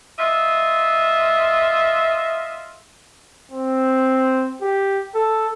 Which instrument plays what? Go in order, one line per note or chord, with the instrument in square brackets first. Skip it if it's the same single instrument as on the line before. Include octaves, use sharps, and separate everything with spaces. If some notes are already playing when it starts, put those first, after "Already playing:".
[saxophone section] F4 D#5 E5
[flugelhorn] C4
G4
A4